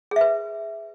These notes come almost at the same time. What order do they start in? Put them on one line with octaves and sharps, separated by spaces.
G#4 E5 B4